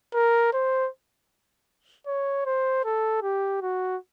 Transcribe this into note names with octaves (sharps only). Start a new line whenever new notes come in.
A#4
C5
C#5
C5
A4
G4
F#4